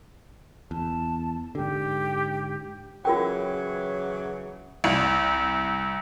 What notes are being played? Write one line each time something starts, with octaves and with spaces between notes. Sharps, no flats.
E2 A5
G#2 D3 G4
C#3 E3 F#3 F4 A#4 G5
C2